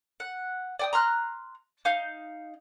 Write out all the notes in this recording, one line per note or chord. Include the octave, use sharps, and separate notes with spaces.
F#5
D5 G5 D#6
A#5 C6 F6 F#6
D#4 F5 G6